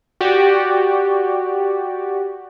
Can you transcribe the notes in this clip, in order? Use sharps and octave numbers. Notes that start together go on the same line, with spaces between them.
F#4 G4 D5